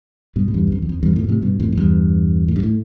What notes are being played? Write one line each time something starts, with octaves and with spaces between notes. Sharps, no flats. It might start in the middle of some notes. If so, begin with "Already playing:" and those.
G2 B2
A2
E2 G2
E2
F2
E2
F2
E2 G2
F2 A2
B2
A2 C3
G2 B2
F2 A2
A2
E2 G2
A2
G2
A2